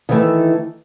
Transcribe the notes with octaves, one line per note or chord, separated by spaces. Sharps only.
D#3 E3 A3